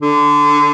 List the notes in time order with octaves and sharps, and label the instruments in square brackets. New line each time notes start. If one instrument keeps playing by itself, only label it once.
[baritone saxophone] D3